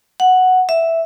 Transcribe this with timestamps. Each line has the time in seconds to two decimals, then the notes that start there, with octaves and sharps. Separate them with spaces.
0.20 F#5
0.69 E5